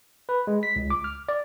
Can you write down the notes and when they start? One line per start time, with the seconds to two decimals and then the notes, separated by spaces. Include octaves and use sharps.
0.29 B4
0.47 G#3
0.63 B6
0.76 C#2
0.90 D6
1.04 F6
1.29 D5